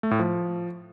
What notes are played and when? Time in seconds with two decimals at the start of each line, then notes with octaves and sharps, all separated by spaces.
0.03 A3
0.11 A2
0.19 F3